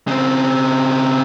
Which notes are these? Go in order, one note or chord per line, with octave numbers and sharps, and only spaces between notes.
C#3 C4